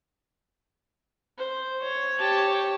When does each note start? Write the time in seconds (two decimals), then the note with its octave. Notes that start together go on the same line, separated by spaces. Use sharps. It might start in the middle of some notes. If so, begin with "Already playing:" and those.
1.38 C5
1.83 C#5
2.19 G4 A5